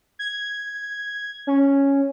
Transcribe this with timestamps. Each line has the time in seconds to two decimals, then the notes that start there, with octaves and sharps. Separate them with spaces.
0.19 G#6
1.47 C#4